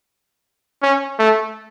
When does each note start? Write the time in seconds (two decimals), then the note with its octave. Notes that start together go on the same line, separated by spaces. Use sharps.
0.82 C#4
1.19 A3